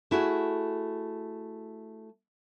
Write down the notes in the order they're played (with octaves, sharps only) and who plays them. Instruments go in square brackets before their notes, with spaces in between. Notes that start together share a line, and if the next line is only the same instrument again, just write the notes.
[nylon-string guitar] A3 E4 F#4 G#4